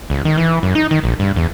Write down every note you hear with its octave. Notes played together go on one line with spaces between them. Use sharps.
C#2
D#3
E3
F#2
D#4
D#3
A#1
G2
E2